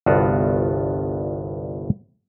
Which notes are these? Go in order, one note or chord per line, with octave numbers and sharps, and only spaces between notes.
G1 C2 G2 B3 F4 F#4